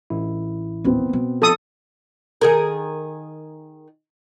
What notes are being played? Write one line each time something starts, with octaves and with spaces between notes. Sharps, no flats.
A1 E4
D#2 A#2 B3 C4
B2
F3 A4 D#6
D#3 G#4 A#4